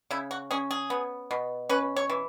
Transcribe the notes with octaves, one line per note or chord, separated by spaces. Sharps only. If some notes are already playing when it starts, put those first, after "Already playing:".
C#3 E4
F#4
C#4 G#4
G#4
B3
B2
C#4 B4
C#5
E3